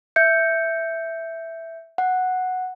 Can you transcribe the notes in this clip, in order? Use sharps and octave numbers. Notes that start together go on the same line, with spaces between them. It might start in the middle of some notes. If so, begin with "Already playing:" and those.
E5 G6 C#7
F#5